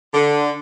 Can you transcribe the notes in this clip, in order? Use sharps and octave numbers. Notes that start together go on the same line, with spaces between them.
D3